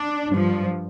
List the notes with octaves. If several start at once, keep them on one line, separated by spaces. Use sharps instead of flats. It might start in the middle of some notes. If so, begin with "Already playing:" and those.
Already playing: D4
G2 F3